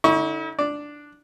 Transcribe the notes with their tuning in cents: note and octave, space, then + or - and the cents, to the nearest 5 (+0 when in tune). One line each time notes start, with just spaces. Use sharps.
D3 +0 E4 -45 C#6 +0
D4 +0 D5 +0